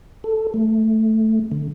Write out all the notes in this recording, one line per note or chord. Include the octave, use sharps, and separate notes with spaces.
A4
A3
D3